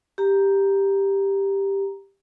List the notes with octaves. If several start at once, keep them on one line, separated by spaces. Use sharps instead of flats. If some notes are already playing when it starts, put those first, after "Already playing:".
G4 A#5